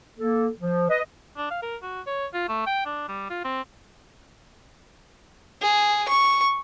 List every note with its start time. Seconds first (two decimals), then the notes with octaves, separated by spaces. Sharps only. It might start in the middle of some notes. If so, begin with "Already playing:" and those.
0.18 A#3 A4
0.58 F3
0.89 B4 D#5
1.37 D4
1.51 F5
1.62 A#4
1.83 F#4
2.07 C#5
2.34 F4
2.48 A3
2.66 G5
2.86 D4
3.08 G3
3.30 F4
3.44 C4
5.62 G#4
6.09 C#6